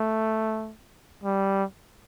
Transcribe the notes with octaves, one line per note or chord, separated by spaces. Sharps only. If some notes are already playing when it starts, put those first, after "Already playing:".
Already playing: A3
G3